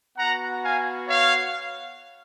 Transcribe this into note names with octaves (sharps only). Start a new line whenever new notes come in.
B3 F#4 F#5 A#5
F5 G#5
C#5 F5